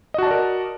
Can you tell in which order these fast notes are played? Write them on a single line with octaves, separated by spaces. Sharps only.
D#5 F#4 A5 D5 A#4